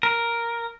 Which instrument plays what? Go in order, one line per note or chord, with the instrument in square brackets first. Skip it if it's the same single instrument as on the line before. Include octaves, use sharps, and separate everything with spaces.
[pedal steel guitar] A#4